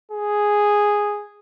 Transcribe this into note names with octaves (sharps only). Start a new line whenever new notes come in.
G#4